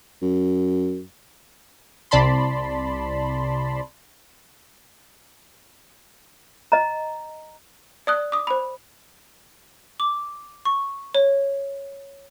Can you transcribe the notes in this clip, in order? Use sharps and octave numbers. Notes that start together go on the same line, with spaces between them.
F#2
C2 C3 D5 A5 B5 C6
D#5 A#5
D5 D#6 F#6
D6 D#6
C5 B5
D6
C#6
C#5